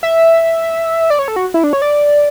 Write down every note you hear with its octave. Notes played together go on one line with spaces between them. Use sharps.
E5
D5
C#5
A4
F#4
E4
D4
C#5
D5